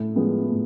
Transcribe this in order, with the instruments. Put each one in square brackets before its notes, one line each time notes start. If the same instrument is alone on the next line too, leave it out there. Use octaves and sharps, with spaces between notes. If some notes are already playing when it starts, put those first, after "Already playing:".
Already playing: [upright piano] A2
F3 G#3 B3
A2